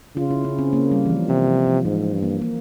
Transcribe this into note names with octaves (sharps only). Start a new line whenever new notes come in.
C#3 F4
E4
C#4
C4
A#3
G3
E3
F3
C3 E3
F3
F3
G#2 E3
G2
A#3
A#3